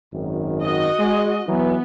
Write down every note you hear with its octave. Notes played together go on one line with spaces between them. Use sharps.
G#1 F#2 D#3
F#4 D#5
G#3
E3 F#3 B3